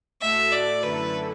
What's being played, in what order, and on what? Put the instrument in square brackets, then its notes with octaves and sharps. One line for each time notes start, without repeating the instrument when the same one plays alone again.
[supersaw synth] A2 A3 F#4 A4 [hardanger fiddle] E5
[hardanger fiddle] D5
[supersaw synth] F#2 D3 A3 E4 A4 [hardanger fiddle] B4